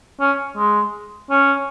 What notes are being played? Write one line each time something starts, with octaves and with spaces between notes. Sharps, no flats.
C#4
G#3
C#4